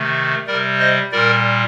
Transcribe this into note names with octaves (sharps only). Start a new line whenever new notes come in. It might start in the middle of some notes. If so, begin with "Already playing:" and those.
Already playing: C3 D#3 A3
C3 G3 A#4 D5
C5 D#5
A#2 G3 A#4 D5